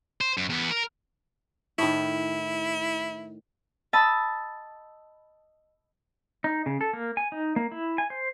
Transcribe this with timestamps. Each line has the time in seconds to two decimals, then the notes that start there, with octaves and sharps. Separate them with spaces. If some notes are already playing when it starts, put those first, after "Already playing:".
0.21 C5
0.38 F#2
0.50 E2 B3
0.71 A#4
1.78 A2 D#3 E4
3.93 D#5 A5 B5 E6
6.44 D#4
6.66 C#3
6.81 A4
6.93 A#3
7.17 G#5
7.32 D#4
7.56 A#3
7.72 E4
7.98 G#5
8.10 C5